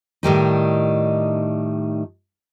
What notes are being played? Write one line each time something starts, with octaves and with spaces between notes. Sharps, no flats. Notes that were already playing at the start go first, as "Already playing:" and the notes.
A2 D#3 G3 D#4